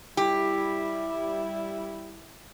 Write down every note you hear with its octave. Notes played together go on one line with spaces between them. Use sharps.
G3 E4 G4